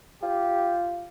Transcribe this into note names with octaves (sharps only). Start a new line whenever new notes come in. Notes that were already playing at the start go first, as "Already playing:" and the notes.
F4 G4